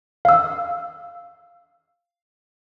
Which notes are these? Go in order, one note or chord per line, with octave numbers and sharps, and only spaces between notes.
F5 E6